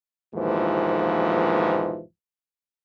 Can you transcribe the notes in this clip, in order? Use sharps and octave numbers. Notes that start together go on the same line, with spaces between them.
A#1 D#2 G#2 B2 E3 F3